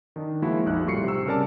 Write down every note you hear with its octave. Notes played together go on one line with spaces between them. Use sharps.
D#3 D4 D#4
F3 G#3 A#3 E4 F#4
A#1 F2 D#4 F#6
A2 G3 F4 C#6 C7 C#7
C3 E6
C#3 G3 A#4 D5 A5